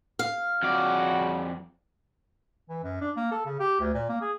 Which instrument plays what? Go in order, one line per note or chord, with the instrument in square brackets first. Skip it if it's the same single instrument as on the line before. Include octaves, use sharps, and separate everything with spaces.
[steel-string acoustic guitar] F5
[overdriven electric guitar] F2 D5 [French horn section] C#3 F#4
[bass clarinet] E3
F#2
D4
A#3
A4
C#3
G4
D2
A#2
A#3
G#4